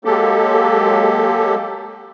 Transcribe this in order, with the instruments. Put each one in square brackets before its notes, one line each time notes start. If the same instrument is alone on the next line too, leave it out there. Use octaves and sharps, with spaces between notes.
[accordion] F#3 G#3 A#3 G4 A4